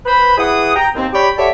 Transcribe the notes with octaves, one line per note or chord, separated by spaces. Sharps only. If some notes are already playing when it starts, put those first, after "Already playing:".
B4 C5 B5
E3 G#4 F#5 D#6
G5 A#5
D#2 C4
G4 C#5 D5 G5 B5
G4 A4 C#5 D5 E5 F#5